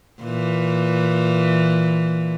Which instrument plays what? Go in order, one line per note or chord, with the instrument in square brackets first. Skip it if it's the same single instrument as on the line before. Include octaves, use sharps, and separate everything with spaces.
[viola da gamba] A#2 E3